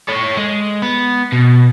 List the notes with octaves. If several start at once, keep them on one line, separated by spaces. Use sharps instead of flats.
A4 C#5
G#3
B3
B2